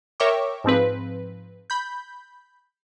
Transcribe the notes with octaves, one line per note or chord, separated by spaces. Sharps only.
A#4 C#5 E5 G5 C#6 D6
G#2 F3 C4 B4
B5 G6